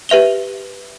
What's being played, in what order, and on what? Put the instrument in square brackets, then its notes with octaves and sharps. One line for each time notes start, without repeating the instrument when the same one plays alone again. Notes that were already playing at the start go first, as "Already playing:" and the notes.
[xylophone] G4 B4 E5 F7 G7